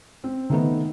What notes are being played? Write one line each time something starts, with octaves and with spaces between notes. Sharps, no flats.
C4
D#3 A3 B3 D#4